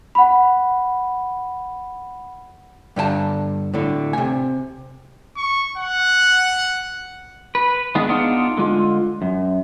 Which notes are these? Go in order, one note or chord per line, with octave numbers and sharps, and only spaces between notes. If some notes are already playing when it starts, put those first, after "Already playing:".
F#5 B5
G2 D3 A#4 A5
A2 D3
C3 G#5
C#6
F#5
B4
D#3 G#3 B3 D4
B3 D4 D#4 F4 G#4 F#5
D3 G#3 F4
F#2